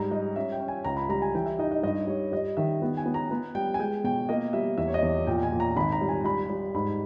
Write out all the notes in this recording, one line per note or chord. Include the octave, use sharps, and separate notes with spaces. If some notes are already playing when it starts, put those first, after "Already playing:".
Already playing: G#2 G3 A#5
G3 D#5
C#4 E5
G5
C#4
G#5
C#2 A#5
B5
G3 A#5
G#5
E3 G5
E5
D#4 D#5
D#5
G2 D#5
G3 C#5
G3 D#5
D#3 E5
B3
G#5
B3
A#5
B3
G3 G5
G#5
G#3 G5
B2 G5
A#3 D#5
G3 E5
E2 E5
C#5
D#5
E2
A#2 G5
G#5
A#2
A#5
G#1 B5
A#5
G3
G#5
G3 B5
G3
G#2 B5